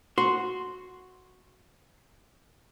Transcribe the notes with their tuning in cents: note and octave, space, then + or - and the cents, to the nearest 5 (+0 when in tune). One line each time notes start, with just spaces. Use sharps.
F#4 -5 C6 +0